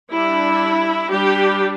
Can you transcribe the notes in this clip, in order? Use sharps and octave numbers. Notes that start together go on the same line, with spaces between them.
G3 D4 E4
G3 D4 G4